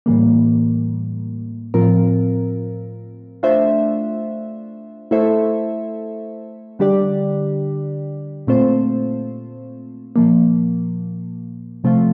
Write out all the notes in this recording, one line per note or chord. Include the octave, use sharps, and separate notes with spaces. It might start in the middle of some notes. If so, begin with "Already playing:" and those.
A2 E3 G3 A#3
A2 F3 C4 F4 A#4
A3 D4 F4 C5 E5
A3 E4 A4 C5 E5
D3 G3 D4 G4 D5
A#2 A3 C4 F4 C5
A#2 F3 A#3
C3 F3 A3 C4 F4